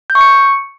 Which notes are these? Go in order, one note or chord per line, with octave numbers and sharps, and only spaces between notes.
G6
C#6
C#7